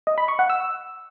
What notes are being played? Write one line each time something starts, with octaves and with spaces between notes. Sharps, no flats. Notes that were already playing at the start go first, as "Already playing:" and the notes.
D#5
B5
C#6
F#5
E6